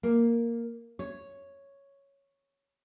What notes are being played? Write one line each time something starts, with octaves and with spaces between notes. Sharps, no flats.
A#3
C#5